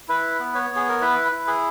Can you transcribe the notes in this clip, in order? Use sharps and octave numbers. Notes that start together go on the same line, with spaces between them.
E4 B4
B3
C#5
B3
G#4
A#4
E4 B4
E4
G#4